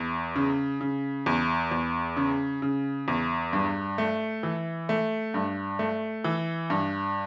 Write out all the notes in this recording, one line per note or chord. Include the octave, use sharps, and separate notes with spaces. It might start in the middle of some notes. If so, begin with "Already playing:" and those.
Already playing: E2
C#3
C#3
E2
E2
C#3
C#3
E2
G2
A3
E3
A3
G2
A3
E3
G2